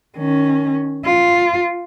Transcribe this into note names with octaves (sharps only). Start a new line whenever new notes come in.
D#3 C#4
F4